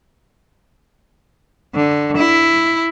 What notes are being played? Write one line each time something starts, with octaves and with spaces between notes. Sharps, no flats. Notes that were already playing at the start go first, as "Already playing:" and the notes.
D3
E4